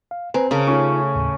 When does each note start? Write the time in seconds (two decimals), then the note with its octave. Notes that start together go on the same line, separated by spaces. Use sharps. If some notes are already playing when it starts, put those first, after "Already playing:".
0.11 F5
0.34 C4 B4 G#5 A#5
0.51 C#3 A#4 C5 A5
0.67 A3 C#4 D#4 F4
1.15 D#2 A2